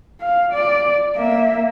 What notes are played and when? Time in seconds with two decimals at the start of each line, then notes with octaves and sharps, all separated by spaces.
0.21 F5
0.53 D5
1.16 A#3 E5